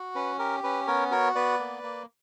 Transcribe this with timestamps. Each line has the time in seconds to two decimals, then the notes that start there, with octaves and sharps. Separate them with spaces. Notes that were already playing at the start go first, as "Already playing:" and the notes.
Already playing: F#4
0.15 C#4 B4
0.39 G4 A#4
0.63 C#4 B4
0.87 B3 A#4 C#5
1.11 F#4 A#4 C#5
1.35 B3 B4 D5
1.60 A#3
1.83 A#3